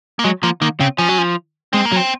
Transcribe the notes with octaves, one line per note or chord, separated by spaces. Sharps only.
A#3
F#3 G#3
F3 A#3
D#3 A#3
C#3 C4
F3 C#4
F#3
F3
G#3 C4
A#3
F#3
C4